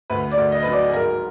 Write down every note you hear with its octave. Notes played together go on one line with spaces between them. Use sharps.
D2 B4
D5
D2
D#5
F#3 B4
D5
G#4
G#1 A#4